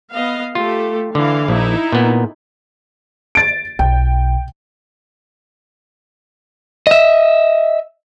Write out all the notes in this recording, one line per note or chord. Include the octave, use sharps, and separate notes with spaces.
B3 D#5 F5
A3 F4 G4 A4
D3 E3 F5
A#1 D#4 E4
A#2 B3
A6 D7
B1 G5
D#5 E5